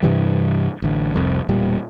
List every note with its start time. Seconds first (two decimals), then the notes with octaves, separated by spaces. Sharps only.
0.03 G2 C3 E3 G3
0.82 A1 D3
1.14 F1 C2 F2
1.49 E1 A#2 G3